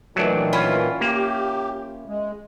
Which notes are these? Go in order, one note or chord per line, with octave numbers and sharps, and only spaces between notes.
A#2 D#3 E3 F#3 A3 D4
C#4 E4 F4
A#3 G4
G#3